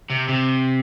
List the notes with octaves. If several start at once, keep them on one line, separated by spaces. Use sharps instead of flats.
C3
C3